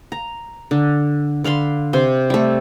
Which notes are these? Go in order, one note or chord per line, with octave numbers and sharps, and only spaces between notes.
A#5
D3
D3 F5 B5 C6
C3 C6
G3 A3